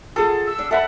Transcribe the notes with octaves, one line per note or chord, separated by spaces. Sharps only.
F4 G#4 A4 F#5
E6
D4
A4 E5 F#5 B5